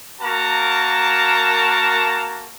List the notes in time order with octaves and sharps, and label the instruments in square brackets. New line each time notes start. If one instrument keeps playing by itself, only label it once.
[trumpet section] A#3 F#4 A#4 A5 A#5